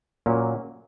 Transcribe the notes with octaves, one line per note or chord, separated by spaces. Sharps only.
A#2 F#3 A#3 C#4